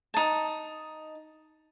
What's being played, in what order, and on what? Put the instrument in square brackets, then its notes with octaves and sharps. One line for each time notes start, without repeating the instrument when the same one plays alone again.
[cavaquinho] D#4 A5